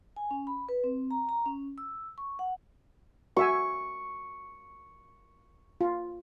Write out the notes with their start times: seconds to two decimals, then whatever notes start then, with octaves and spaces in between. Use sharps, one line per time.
0.16 G#5
0.31 C#4
0.47 B5
0.69 B4
0.84 C4
1.11 A#5
1.29 A#5
1.46 C#4
1.78 E6
2.18 C#6
2.39 F#5
3.37 F#4 E5 G#5 C#6
5.81 F4